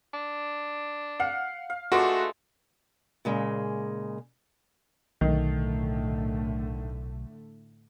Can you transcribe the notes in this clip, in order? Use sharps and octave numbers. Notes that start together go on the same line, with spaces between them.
D4
F5 F#5
F5
G#3 A3 D4 F4 F#4 B4 C6 C#6
A#2 C#3 G#3
B1 A2 D3 D#3 A3